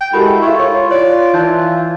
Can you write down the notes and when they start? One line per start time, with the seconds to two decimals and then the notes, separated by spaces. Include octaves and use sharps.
0.01 G5
0.13 G#3 E4 F#4 G4 A4 A#4 B5
0.42 E4 F4 C#6
0.59 C#5
0.91 C#5 D5
1.34 E3 A5 G6